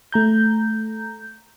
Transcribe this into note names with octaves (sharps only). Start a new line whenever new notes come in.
A3 A#5 G6